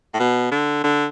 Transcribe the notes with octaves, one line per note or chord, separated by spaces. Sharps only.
A2
B2
D3
D3